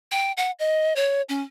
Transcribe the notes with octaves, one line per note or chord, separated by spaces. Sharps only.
G5
F#5
D#5
C#5
C#4